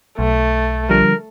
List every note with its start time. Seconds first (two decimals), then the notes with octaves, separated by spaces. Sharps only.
0.19 B1 A3
0.89 D3 F3 G3 A#4